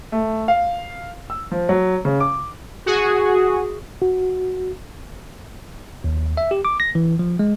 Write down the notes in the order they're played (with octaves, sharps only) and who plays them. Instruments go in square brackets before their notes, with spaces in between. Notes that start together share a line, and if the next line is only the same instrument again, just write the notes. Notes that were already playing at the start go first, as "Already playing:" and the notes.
[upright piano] A3
F5
E6
F3
F#3
C#3
D6
[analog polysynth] F#4 G#4
[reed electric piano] F#4
[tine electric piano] D#2
E5
G4
D6
A#6
E3
F3
G#3